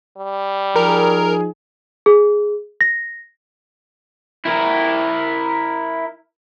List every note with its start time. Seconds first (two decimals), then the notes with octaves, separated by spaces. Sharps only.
0.18 G3
0.76 F3 D#4 G#4 A#4
2.06 G#4
2.81 A#6
4.46 E4 A#4